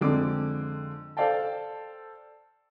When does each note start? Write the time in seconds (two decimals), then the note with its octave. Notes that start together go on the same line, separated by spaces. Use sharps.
0.01 F2 D3 G#3 C4 D6
1.17 A4 C5 D5 F5 G5 A5